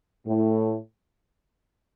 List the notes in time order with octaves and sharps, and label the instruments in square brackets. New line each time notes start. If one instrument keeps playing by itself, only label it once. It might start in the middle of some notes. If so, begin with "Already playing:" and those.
[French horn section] A2